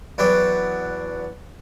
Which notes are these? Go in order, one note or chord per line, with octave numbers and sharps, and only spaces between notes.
E2 F#3 B3 D4 G5